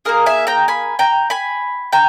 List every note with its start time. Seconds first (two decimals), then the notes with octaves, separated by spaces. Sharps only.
0.05 A#3 D#4 G#4 A#4
0.26 E5 G#5
0.47 G5 A#5
0.68 G#5 B5
0.99 G5 A#5
1.30 G#5 B5
1.92 G5 A#5